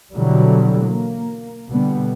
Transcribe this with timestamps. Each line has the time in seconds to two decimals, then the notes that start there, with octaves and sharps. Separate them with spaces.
0.13 B2 D3 E3 F#3 G3
0.86 A#3
1.70 B2 D3 G3 B3